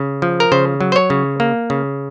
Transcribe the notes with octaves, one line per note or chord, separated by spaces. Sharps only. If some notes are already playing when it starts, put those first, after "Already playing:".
Already playing: C#3
F3
A#4
C#3 C5
F#3
C5
C#5
C#3
A#3
C#3